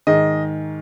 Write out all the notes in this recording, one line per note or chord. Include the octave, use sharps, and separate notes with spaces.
G#2 D#3 G#3 D#5